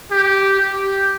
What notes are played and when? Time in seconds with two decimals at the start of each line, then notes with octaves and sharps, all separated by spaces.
0.11 G4
0.60 G4